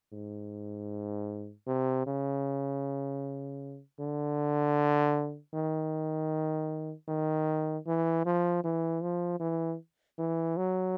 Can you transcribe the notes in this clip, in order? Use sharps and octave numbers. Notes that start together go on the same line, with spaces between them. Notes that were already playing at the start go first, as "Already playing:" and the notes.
G#2
C3
C#3
D3
D#3
D#3
E3
F3
E3
F3
E3
E3
F#3